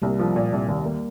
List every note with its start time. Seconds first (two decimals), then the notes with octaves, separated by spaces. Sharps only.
0.02 C2 G3 A#3
0.19 F3
0.36 A#2
0.52 C2
0.68 D#2
0.86 A#3